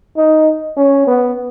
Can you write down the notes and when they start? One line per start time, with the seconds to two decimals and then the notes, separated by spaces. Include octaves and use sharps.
0.17 D#4
0.77 C#4
1.07 B3